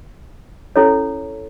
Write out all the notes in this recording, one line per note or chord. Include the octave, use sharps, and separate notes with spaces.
C#4 E4 A4 C#5